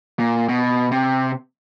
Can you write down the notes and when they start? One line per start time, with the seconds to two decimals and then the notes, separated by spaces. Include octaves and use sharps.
0.19 A#2
0.49 B2
0.92 C3